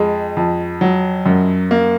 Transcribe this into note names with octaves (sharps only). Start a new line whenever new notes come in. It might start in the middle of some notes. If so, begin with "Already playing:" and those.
Already playing: F2 G#3
F2
F#3
F#2
A#3